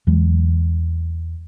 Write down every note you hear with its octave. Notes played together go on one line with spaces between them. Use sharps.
E2 E3 F#3 G#3